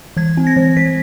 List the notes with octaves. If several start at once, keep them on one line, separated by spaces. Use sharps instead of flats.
E3 G#6
C4
A#6
E3
E3 B6